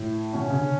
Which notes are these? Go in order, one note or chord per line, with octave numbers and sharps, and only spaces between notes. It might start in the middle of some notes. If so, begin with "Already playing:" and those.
Already playing: A2
B2 C#4
C#3
D3